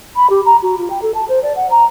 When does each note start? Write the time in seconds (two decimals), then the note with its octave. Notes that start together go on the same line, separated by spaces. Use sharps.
0.16 B5
0.30 G4
0.45 A#5
0.62 F#4
0.78 F4
0.90 G5
1.02 A4
1.14 A5
1.29 C5
1.43 D5
1.56 F#5
1.70 A#5